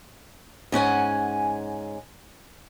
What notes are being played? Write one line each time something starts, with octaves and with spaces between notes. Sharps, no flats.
G#2 C#4 F#5 G#5